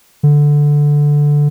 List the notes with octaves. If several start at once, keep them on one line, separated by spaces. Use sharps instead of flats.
D3